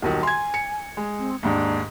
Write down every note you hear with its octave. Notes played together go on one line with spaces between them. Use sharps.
D#1 B1 D#3 A#4
G#5 C6 G#6
C#7
G#3
C4
D#2 G#2 D4